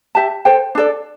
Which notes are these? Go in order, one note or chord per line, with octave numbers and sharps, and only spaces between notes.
G4 E5 A5
A4 C5 G5
D4 A4 D5